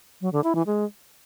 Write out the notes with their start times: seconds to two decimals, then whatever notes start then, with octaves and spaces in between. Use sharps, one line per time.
0.21 F#3
0.33 D3
0.44 E4
0.55 E3
0.67 G#3